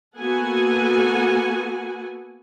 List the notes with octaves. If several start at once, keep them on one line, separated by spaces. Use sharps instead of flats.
A#3 B3 F#4 A4 F#5 G#5